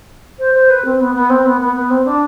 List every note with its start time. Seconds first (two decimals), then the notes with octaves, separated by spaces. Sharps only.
0.39 C5
0.54 C5
0.69 B4
0.84 C4
1.00 B3
1.14 B3
1.29 C4
1.45 B3
1.60 B3
1.75 B3
1.90 C4
2.05 D4